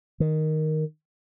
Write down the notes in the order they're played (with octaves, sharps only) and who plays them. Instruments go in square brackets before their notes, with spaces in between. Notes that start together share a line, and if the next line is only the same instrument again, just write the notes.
[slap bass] D#3